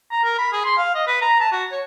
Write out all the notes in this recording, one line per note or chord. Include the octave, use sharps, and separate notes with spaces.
A#5
A#4
B5
G#4
C6
F5
D#5
B4
A#5
A5
F#4
C#5